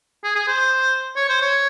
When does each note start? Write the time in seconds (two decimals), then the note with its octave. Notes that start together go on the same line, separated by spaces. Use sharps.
0.24 G#4
0.35 G#4
0.48 C5
1.16 C#5
1.29 C5
1.42 C#5